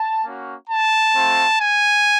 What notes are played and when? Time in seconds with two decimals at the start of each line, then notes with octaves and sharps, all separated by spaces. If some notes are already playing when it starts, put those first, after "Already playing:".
Already playing: A5
0.23 A#3 C#4 F#4
0.68 A5
1.14 A3 C4 F4
1.59 G#5